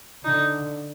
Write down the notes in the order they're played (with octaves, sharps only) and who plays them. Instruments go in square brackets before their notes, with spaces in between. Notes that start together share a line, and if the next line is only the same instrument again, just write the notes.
[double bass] D3 [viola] D#4